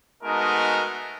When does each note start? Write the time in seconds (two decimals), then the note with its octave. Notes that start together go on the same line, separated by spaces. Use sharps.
0.23 G#3 A3 B3 D#4 F#4 A#4